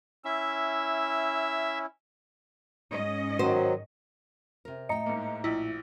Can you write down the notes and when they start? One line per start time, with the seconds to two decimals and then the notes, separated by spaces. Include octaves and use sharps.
0.25 C#4 E4 E5
2.93 G#2 C#4 D#5
3.39 D#3 F#3 C5
4.65 C3 A#4
4.89 A2 D#5 G5 A#5 C#7
5.06 G#2 A#3
5.44 A#1 E4